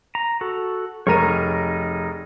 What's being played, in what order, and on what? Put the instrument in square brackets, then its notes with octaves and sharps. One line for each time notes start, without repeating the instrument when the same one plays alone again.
[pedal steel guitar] A#5
F#4 A4
[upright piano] F1 A#4 D#7 [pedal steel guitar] D#4 G#4 C#5